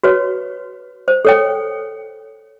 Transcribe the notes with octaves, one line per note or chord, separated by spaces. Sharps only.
F#4 B4 C#5
C5
A4 C#5 G5